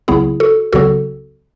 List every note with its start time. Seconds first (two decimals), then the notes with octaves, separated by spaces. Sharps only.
0.08 C#2 C#3 F#3 B3 E4 G#4
0.40 F#4 A4
0.73 C#2 C#3 F#3 B3 F#4 A4